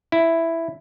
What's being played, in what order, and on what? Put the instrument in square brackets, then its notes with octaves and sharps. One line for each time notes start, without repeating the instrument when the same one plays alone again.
[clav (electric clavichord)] E4